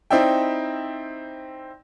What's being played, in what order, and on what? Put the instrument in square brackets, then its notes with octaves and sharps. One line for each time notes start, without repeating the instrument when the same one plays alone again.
[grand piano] C4 D#4 E4 D5 E5 G5